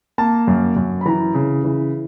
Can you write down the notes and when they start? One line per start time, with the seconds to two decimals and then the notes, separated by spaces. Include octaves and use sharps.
0.18 A#3 A5
0.47 F#2
0.76 F#2
1.01 B5
1.06 E3 A#5
1.34 C#3
1.64 E3